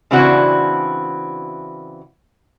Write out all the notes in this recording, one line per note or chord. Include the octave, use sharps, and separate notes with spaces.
C#3 E3 C4 D4 E4 F#4